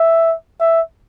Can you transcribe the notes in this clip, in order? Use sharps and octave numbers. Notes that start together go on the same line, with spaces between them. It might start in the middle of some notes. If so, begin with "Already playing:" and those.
Already playing: E5
E5